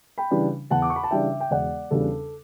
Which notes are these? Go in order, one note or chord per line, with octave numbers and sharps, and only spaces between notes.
G5 B5
C#3 E3 G3 D4
E2 F#5 A5
D6
C#6
B5
A5
C#3 E3 G3 D4 E5 G5
G5
E1 D5 F#5
E2 C#3 G3 D4 A4